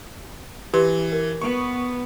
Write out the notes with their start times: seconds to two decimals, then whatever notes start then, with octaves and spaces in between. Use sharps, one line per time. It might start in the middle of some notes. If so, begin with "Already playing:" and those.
0.74 E3 G4 B4 C6
1.12 A#4
1.42 B3 C#6